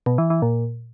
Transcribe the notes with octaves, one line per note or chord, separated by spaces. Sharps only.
B2
E3
E3
A#2